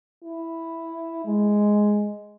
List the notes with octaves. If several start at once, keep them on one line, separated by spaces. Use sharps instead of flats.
E4
G#3